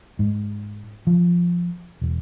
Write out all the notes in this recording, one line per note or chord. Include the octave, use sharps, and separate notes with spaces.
G#2
F3
E1